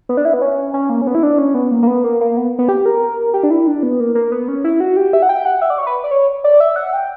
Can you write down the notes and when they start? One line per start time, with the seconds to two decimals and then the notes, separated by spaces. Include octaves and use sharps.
0.09 B3
0.17 D4
0.25 E4
0.34 B3
0.42 C#4
0.74 C#4
0.90 A#3
1.02 C#4
1.07 B3
1.15 E4
1.23 D4
1.38 C#4
1.55 B3
1.71 A#3
1.83 A#3
1.87 B3
2.04 A#3
2.21 A#3
2.37 B3
2.59 B3
2.69 G4
2.86 A#4
3.34 G4
3.43 D4
3.50 E4
3.67 D4
3.83 B3
4.00 A#3
4.15 A#3
4.32 B3
4.48 C#4
4.64 E4
4.80 F#4
4.97 G4
5.13 E5
5.22 F#5
5.29 G5
5.45 F#5
5.62 E5
5.70 D5
5.78 C#5
5.87 B4
6.04 D5
6.11 C#5
6.44 D5
6.60 E5
6.76 F#5
6.93 G5